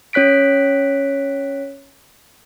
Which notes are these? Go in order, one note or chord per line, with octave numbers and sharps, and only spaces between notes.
C#4 C#5 F#6 B6 D7